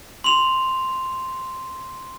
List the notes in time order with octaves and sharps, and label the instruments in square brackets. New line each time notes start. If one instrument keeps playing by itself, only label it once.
[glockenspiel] C6 F7